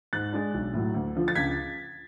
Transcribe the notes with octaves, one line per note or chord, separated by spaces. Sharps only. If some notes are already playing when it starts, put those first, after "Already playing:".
G#2 F#6 A6
G#3 D4
B1
A2 F#3
D2
D3 F3
A6
C#2 G#6 B6